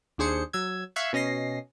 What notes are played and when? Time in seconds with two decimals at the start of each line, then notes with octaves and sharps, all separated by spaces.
0.18 D#2 D4 G#4 C5 C#7
0.53 F#3 E6 G#6
0.96 E5 F5 C#6 E6 F#6 G#6
1.13 B2 C#4 D#5 A#6 C7